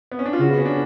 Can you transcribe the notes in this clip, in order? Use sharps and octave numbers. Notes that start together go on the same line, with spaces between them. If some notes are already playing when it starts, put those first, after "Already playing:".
B3
C#4
D4
F4
C#3 F#4
B3
C#4
D4